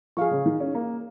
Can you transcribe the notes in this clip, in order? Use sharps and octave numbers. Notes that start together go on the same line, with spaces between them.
F3 G#4 F5 C#6
C#3
D#3
C#4
A#3